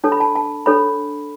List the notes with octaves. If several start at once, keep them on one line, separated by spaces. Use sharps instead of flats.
D4 A4 C#5 A5
B5
A5
A5
D4 A4 C#5 B5